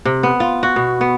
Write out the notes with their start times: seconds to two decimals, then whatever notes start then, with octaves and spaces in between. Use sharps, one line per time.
0.05 C3
0.23 B3
0.40 F4
0.63 F#4
0.76 B2
1.01 B3